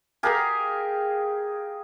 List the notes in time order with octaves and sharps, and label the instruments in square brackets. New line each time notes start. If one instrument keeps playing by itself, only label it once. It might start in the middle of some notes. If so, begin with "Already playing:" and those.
[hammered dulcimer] G4 G#4 A#4 F5